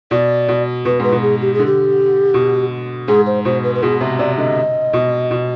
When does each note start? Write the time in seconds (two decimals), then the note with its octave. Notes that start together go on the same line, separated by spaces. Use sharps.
0.11 B2 D5
0.48 B2
0.85 B2 B4
0.99 G#2 B4
1.12 B2
1.22 G#4
1.42 G4
1.54 G#4
1.59 D3
1.66 G4
2.34 B2
3.08 G#2 G#4
3.27 C5
3.45 B2 C5
3.64 B4
3.75 B4
3.83 B2 G#4
4.01 C3
4.19 C3 D5
4.38 D3 D#5
4.93 B2
5.31 B2